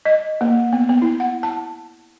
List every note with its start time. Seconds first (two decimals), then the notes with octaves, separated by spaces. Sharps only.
0.05 D#5
0.41 A#3
0.73 B3
0.89 B3
1.02 E4
1.20 F#5
1.43 A5